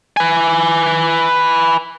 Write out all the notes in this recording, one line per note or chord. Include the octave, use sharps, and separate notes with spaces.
B4 G#5